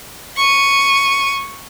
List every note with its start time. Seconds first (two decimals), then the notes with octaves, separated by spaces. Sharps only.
0.37 C#6 D#7